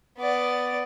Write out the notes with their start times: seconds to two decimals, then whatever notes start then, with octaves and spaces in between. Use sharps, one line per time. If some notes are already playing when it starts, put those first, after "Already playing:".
0.18 B3 D5